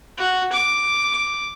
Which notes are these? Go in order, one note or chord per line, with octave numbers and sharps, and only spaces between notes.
F#4
D6